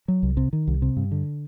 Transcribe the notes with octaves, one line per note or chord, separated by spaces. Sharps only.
F#3
C2
C3
D#3
C2
C3
G2
D3